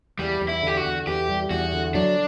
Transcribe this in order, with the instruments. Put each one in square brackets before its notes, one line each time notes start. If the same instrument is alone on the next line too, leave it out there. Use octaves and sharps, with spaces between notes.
[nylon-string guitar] E2 [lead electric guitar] G3
[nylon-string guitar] E2
[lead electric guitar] E4
[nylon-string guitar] D3 [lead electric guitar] G4
[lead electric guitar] F#4
[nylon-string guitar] E2
[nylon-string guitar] E2 [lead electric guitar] G4
[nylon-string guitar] G3
[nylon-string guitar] E2 [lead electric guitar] F#4
[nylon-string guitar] D3
[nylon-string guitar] F#3 [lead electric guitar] D4